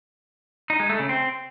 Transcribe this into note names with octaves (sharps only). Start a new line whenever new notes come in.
D#4
G#3
A3
C#3
C4